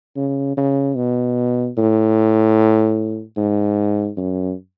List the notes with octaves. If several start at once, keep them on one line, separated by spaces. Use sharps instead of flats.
C#3
C#3
B2
A2
G#2
F#2